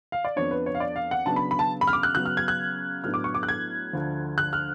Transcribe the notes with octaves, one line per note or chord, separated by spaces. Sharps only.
F5
D5
F2 F3 B3 D4 C#5
B4
C#5
F5
D5
F5
F#5
C#3 F#3 B3 D4 A5
B5
B5
A5
B5
F6
D6
F#6
C#3 F#3 B3 F#6
F6
G#6
F#6
A2 F#3 B3 D4 F6
D6
C#6
D6
F#6
G#6
D2 D3 F3
F#6
F6